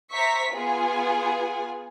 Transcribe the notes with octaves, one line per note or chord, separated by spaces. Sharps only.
C5 E5 A#5 C#6 B6
B3 F4 G#4 G#5